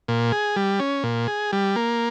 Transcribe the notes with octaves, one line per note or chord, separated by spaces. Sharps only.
A#2
G#4
G3
C#4
A#2
G#4
G3
A#3